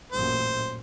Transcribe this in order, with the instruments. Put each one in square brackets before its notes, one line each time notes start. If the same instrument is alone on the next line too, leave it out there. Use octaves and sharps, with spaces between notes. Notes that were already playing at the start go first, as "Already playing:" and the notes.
[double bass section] A1 F#2 A#2 [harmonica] C5